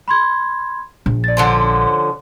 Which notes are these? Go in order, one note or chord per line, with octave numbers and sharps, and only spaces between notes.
B5 C6 G#6
A#1
D5 A6
D3 F3 C#4 C6